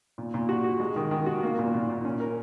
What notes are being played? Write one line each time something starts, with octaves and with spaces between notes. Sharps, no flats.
A#2
A#2
F#4
F#4
G#3
D#3
D#3
F#4
A#3
A#2
A#2
A#2
C#4
A#4